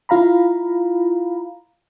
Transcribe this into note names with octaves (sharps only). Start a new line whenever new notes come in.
E4 F4 F5 A#5 B5